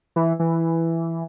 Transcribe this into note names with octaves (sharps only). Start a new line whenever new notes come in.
E3
E3